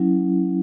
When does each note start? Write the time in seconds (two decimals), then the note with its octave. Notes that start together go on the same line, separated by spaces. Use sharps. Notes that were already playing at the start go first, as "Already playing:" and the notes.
Already playing: F#3 C#4 E4